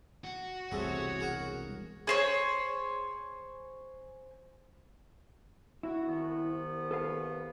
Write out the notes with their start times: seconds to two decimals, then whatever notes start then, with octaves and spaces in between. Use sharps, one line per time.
0.24 F#4
0.71 E1 C2 C3 A3 G#4 C#5
1.20 G#4 A#4 F#5
2.07 G#4 C5 C#5
5.83 E4 F#4
6.07 C2 D#3 B3
6.91 A4 B4 F5